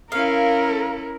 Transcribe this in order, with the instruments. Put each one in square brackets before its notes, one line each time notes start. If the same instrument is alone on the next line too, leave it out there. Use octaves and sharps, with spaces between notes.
[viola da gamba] C#4 E4 [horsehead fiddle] A#4 [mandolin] F5